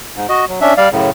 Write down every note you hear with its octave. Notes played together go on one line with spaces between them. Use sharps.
G#2
F#4 D#5
F#3
C#4 D4 E5
G3 D5 F5
F#2 A2 C#3